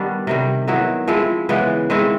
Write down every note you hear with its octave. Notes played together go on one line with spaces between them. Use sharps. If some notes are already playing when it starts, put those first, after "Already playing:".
Already playing: D#3 G3 B3 D4
C3 D#3 G3
D#3 F#3 B3 E4
F3 G#3 C4 E4
C#3 E3 G#3 B3
D#3 G#3 C4 E4